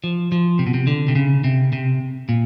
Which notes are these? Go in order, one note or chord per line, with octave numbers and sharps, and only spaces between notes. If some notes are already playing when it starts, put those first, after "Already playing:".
F3
F3
C3
B2
C3
D3
C3
C#3
C3
C3
A#2